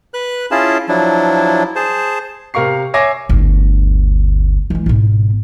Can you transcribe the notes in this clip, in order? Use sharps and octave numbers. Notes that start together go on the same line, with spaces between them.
B4 F#6
C#4 E4 F4 G#4 A5
F3 F#3 D4 E4
G#4 C5 A5
C3 A#4 F5 C#6 C7
C#5 E5 G#5 D6 A#6 C7
G1 D2
E3 G#3
G#1 B2